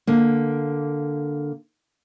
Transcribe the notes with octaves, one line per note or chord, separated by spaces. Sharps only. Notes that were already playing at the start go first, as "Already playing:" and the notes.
D3 A#3